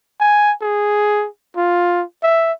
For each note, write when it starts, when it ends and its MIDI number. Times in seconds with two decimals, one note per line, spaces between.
0.20 0.53 80
0.61 1.27 68
1.56 2.04 65
2.23 2.52 76